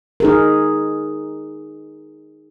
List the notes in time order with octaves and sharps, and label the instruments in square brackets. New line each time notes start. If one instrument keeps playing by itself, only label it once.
[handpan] D#4 G#4 A#4